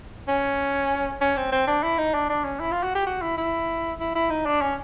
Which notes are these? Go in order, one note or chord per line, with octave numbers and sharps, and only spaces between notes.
C#4
C#4
C4
C4
D4
E4
D#4
D4
D4
C#4
E4
F4
F#4
G4
F#4
E4
E4
E4
E4
D#4
D4
C#4